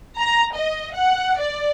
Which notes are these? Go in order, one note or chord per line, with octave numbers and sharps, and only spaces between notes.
A#5
D#5
F#5
D5